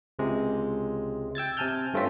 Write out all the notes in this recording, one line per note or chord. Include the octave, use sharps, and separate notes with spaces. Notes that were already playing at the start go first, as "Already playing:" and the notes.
C#2 C3 G#3
G5 E6 G#6 A6
C3 G#5 A5 F6 G6
G2 A3 C4 C#4 F4 B6